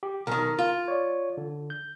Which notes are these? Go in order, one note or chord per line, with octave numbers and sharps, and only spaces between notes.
G4
B1 D#3 A#4
F4
C#5 D5
D3
G6